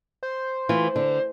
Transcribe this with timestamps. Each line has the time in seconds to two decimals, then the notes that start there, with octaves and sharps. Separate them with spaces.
0.23 C5
0.69 E3 A3 F4
0.96 D3